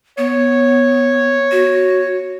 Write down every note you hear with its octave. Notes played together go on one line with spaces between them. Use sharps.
B3 C#5
F#4